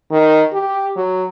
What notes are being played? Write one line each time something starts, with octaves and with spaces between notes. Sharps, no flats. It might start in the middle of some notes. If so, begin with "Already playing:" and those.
D#3
G4
F#3